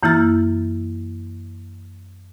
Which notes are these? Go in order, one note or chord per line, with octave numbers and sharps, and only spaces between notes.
F#2 E3 A#3 E4 F6 A6